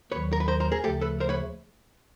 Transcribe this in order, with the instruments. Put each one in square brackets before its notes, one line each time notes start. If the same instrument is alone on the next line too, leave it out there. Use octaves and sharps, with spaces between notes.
[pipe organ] D#2 D#3 F#3 [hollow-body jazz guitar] B4 C#5
[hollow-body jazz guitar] A#4
B4
A#4 C5
A#4 C5
G#4 A#4
[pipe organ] D2 C#3 F3 A3 [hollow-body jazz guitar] G4 A4
[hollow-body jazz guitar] A4 B4
A#4 C5
B4 C#5